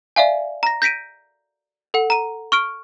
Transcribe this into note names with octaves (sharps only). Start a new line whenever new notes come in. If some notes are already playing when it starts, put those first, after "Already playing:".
D5 E5 F5 G#5
A#5 A#6
G6 A#6 B6 D7 D#7
A4 F#5
A#5 D#7
C#6 F6 D7